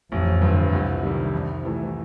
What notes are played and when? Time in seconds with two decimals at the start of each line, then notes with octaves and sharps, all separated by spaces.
0.12 A1 F2
0.42 G2 D3
0.73 C2
1.03 C3 D#3 G3
1.33 F2
1.63 C3 E3 A3